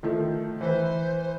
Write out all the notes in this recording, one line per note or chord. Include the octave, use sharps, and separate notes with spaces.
D#3 F3 A3
E3 B4 C5